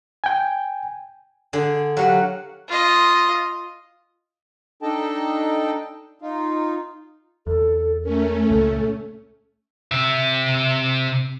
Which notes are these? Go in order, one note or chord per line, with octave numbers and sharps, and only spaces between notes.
G5 G#5
D3 G#4 D5
F#3 G4 A#4 B4 F5 F#5
F4 D#5
D4 D#4 A4 D#5 G5 A5
D#4 F4
E2 A4
A3 C#4 A#4
C#2 A#2 A4
C3 E5